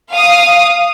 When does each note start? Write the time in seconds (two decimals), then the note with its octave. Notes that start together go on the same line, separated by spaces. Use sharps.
0.11 F5 D#6